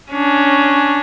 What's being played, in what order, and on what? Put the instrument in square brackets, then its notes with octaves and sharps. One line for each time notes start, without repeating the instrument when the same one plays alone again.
[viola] C#4 D4